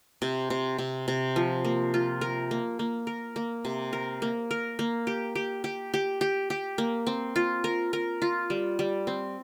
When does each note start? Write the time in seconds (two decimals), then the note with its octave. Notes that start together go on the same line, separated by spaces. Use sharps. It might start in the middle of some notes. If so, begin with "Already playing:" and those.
0.22 C3
0.50 C3
0.78 C3
1.08 C3
1.36 F3
1.65 A#3
1.94 F4
2.21 A#4
2.51 A#3
2.79 A#3
3.07 A#4
3.36 A#3
3.65 C3
3.93 A#4
4.22 A#3
4.51 A#4
4.79 A#3
5.07 G4
5.35 G4
5.64 G4
5.94 G4
6.21 G4
6.50 G4
6.78 A#3
7.07 C4
7.36 F4
7.64 A#4
7.93 A#4
8.22 F4
8.50 G3
8.79 G3
9.07 C4